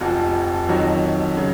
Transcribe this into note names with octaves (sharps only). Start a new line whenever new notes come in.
F1 F2 F3 F#4
F2 D#3 F#3 F#4
C#3 F#3